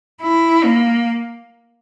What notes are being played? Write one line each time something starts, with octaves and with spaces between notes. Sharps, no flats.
E4
A#3